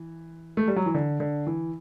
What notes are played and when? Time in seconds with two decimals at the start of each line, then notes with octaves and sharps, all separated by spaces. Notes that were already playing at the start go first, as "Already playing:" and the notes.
Already playing: E3
0.57 A3
0.68 G3
0.76 F#3
0.86 E3
0.94 D3
1.20 D3
1.47 E3